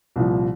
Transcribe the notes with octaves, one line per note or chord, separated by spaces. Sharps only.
C2 A#2 F3